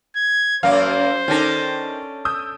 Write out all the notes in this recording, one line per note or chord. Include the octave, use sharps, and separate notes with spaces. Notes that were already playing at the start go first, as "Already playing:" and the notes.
G#6
F#2 A#3 C5 F5
D#3 C#4 D4 A4 A#6
D#6 E6 G6